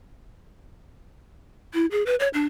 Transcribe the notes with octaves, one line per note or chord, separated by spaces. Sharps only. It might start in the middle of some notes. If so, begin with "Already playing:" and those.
E4
G#4
B4
C#5
D4